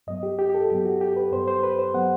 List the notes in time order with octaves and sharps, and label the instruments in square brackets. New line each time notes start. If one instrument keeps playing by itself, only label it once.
[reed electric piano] G2 F#3 B3 D#5
G4
G4
G4
A4
G2 F#3 B3 G4
F#4
G4
B4
G2 F#3 B3 C5
C5
B4
C5
F#3 B3 F#5